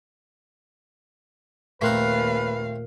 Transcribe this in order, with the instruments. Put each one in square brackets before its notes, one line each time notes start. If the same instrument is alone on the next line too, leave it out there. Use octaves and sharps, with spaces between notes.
[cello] D#2 F5 [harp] A#2 F#6 [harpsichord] A3 C4 A#4 [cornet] B4